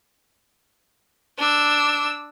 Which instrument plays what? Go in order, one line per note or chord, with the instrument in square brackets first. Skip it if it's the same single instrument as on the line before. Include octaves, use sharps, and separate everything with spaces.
[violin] D4 E6